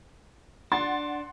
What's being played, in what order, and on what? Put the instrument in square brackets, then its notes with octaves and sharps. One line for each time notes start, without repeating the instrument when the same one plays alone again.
[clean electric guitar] D4 [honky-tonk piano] F#5 C6 A6